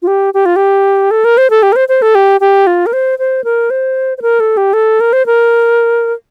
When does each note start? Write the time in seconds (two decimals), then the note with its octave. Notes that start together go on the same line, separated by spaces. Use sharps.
0.02 F4
0.07 G4
0.34 G4
0.46 F4
0.56 G4
1.11 A4
1.24 A#4
1.38 C5
1.50 A4
1.63 G4
1.72 A#4
1.76 C5
1.89 C5
2.02 A4
2.15 G4
2.41 G4
2.67 F4
2.86 A#4
2.93 C5
3.19 C5
3.44 A#4
3.70 C5
4.18 C5
4.22 A#4
4.40 A4
4.57 G4
4.73 A4
5.00 A#4
5.13 C5
5.26 A#4